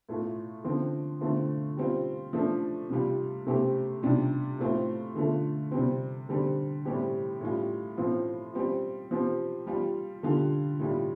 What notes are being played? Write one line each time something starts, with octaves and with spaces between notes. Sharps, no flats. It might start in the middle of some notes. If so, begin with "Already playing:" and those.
A2 A3 F4
D3 F3 C4
D3 A3 C4 F4
G3 C4 F4
F3 A3 D4
C3 G3 F4
C3 A3 C4 G4
C3 G3 D4 F4
A2 A3 C4 F4
D3 A3 F4
C3 G3 C4
D3 G3 C4
A2 G3 C4 G4
A2 G3 F4
A2 F3 C4 F4
G3 C4 F4
F3 C4 G4
G3 F4
D3 G3 F4
A2 G3 F4